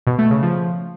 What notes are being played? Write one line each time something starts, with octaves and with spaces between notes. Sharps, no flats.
B2
A3
C#3
F3